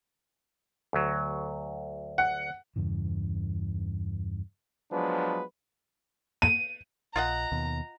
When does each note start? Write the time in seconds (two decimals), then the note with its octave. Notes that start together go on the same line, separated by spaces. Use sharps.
0.93 D2 F#3
2.18 F#5
2.76 E2 G2 C#3 E3
4.91 F3 F#3 G#3 B3 D4 B4
6.42 D#7
7.16 A#1 F4 D#5 F#5 A#5
7.52 D#2 B2